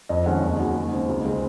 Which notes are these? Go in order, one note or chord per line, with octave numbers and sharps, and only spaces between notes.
F2 D#5
D#3 G#3 C#4 F#5
D#2 D#5
C#3 F#3
D#2
C#3 G#3 C4
C#2
C#3 G#3 C4